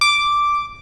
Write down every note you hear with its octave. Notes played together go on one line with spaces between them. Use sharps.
D6